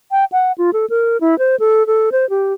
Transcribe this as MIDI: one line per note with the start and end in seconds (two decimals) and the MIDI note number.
0.11 0.25 79
0.32 0.52 78
0.58 0.71 65
0.73 0.86 69
0.90 1.17 70
1.21 1.38 64
1.39 1.56 72
1.60 1.86 69
1.87 2.10 69
2.12 2.29 72
2.30 2.53 67